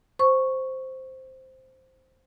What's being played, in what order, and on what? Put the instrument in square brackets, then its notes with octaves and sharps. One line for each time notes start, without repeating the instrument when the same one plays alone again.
[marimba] C5 C#6